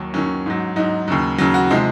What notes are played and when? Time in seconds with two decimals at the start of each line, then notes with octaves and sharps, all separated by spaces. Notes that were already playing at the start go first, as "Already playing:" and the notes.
Already playing: D#2 D#3 F#3
0.14 D#2 D#3 F#3 C#4
0.46 G#2 F#3
0.76 G#2 F#3 D#4
1.08 D#2 C#3 F#3
1.38 D#2 C#3 F#3
1.54 F#4
1.71 C3 F3 G#3 D#4